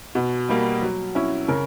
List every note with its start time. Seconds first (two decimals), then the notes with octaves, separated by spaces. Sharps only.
0.15 B2
0.49 G3 A#3
0.82 F#3
1.15 C#4 E4
1.48 C#3 A#4